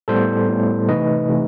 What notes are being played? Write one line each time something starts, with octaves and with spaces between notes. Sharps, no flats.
A2 G3 B3 A4 C5
A2 G3 B3
C3 E3 A3 D#4 B4 D#5
C3 E3 A3 D#4